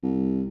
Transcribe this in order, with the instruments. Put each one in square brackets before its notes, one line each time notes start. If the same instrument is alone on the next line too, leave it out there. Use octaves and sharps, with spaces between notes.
[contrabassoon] C2